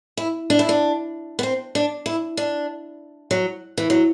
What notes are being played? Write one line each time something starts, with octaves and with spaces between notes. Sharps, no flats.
E4
D4
E4
D4
B3
C4
D4
E4
D4
F#3
E3
F#3